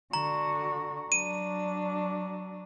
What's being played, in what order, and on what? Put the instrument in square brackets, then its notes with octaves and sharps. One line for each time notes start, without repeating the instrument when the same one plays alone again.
[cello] D3 F#4 [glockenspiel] A#5
[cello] F#3 D4 [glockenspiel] D#7